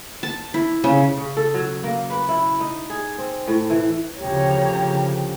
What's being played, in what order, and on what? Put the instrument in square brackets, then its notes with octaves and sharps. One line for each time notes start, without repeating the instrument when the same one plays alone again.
[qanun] A5
E4
C#3
[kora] C#3
A4
F#3
A#3
B4
E4
D#4
G#4
C4
A2
E3
[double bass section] D2 C#3 F3 [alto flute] G4 [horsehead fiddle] C#5 A#5